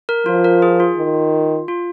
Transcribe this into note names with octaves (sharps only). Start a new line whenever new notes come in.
A#4
F3 F4
A#4
G#4
F4
D#3
F4